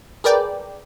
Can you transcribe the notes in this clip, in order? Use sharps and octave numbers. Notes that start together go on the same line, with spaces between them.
G#4 A#4 B4 D5 G5